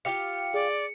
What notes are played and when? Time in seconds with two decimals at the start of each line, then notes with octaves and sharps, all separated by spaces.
0.05 F4 G4 F5 C#7
0.54 G#4 D5